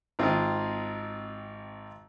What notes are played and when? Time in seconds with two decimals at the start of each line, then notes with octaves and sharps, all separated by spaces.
0.19 G#1 C4 F4 G#4